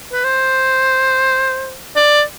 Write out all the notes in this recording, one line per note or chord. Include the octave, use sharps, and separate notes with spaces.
B4
C5
D5